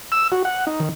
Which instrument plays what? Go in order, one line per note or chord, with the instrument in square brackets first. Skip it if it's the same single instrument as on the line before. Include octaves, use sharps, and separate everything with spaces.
[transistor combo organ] E6
F#4
F#5
D#4
D#3